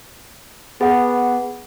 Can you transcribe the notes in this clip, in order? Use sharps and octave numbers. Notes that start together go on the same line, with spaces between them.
B3 G#4 F#5